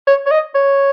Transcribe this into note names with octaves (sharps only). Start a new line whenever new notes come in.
C#5
C#5
D#5
C#5